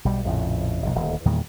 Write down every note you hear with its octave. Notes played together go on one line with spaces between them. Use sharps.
B1 G3
A#1 F2 A2 C#3
F#1 B1
D#1 D2
E2 A#2 D#3 G3